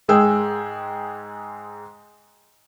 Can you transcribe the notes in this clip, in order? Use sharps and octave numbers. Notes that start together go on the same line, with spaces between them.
G#2 G#3 G#4 G5 E6